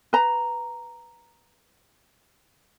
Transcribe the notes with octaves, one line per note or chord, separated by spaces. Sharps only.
B4 A#5